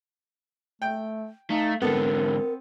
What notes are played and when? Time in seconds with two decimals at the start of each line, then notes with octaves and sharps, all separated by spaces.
0.82 A3 G5
1.50 A3 D#4 F5
1.82 G#2 D3 B3 C4 A4 A#4